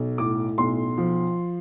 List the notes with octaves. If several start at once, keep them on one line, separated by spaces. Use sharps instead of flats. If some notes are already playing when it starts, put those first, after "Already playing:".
Already playing: B1
A2 D6
B1 C6
F3